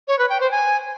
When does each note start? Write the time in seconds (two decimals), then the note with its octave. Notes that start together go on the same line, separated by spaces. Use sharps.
0.08 C#5
0.19 B4
0.30 G5
0.40 C5
0.51 G#5